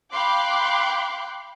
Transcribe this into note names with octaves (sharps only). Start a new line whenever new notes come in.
F5 G5 B5 C6 D6 F#6